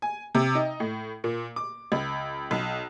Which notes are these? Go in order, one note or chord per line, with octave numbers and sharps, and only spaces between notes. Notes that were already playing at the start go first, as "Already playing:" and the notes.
G#5
C3
D#4
A2
A#2
D6
C#2
B1